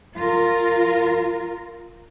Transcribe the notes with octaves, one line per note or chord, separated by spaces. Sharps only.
F4 A#4